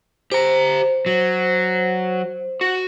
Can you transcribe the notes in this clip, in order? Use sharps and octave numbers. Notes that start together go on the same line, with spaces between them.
G4 C5 A#5
F#3
F#4